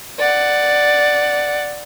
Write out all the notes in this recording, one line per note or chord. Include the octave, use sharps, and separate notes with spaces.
D5 F#5